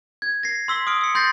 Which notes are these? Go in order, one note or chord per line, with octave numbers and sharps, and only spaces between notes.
G#6
A#6 C7
C6 E6 B6 G7
D#6 F6 D7
E6 C#7
C6 G6 A6 A#6 C7